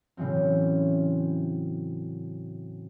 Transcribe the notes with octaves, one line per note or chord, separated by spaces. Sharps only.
A2 C#3 E3 F#3 C4